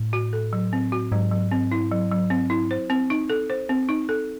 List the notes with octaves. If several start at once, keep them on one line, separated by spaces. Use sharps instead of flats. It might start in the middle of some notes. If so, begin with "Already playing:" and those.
Already playing: A2
F#4
A4
F#3
C4
F#4
G#2 F#3
F#3
C4
E4
F#3
F#3
C4
E4
C5
C4
D#4
A4
C5
C4
D#4
A4